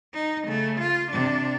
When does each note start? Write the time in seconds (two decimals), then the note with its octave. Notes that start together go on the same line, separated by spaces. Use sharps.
0.14 D#4
0.47 C#3 A3
0.80 F4
1.11 C3 D4